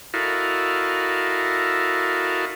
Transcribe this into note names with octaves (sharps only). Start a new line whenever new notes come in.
E4 F#4 A4 A#4 D#5 F5